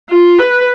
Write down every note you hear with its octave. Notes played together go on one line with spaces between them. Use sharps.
F4
B4